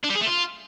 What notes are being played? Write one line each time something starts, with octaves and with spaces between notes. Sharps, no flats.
D4
G3
G#4
A3
F4